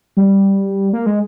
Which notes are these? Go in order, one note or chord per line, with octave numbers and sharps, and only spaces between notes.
G3
A#3
G#3